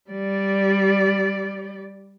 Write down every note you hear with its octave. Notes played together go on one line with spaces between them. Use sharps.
G3 D5